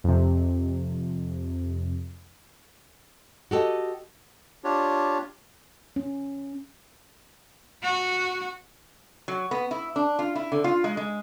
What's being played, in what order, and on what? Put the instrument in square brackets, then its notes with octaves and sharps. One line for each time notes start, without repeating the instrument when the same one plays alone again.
[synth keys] F2 C3
[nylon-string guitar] F#4 G4 A4 D#5
[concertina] D4 F4 G4 C#5
[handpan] C#4
[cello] F#4
[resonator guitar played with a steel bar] F#3
B3
E4
D4
F4
E4
D3
F4
G#3
G#3